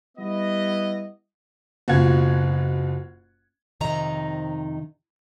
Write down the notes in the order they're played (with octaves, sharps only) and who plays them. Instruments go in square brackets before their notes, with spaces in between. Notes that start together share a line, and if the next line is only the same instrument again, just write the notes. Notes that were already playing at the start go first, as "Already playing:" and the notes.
[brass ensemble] G3 B3 E4 D#5
[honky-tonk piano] F#1 B2 F4 F#5 G#6
[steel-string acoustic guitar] F2 C3 D#3 D#4 A#5